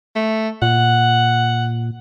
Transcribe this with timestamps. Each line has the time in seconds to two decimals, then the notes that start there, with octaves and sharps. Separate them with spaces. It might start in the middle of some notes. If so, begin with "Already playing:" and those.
0.16 A3
0.62 A#2 F#5